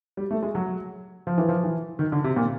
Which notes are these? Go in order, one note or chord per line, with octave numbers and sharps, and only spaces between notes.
G3
A3
G#3
F#3
F3
E3
F3
E3
D#3
D3
C3
A#2